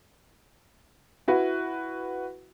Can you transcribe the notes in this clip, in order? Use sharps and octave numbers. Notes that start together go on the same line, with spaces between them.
E4 F#4 B4